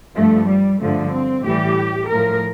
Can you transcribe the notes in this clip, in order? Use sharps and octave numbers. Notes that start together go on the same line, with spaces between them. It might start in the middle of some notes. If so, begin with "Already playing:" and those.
G2 F3 A3
G3
G2 D3 F3 A3
C4
A2 E3 G3 G4
A2 F3 A#4